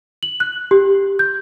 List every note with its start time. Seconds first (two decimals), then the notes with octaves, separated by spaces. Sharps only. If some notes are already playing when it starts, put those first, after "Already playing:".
0.23 F#7
0.40 F#6
0.71 G4
1.19 G6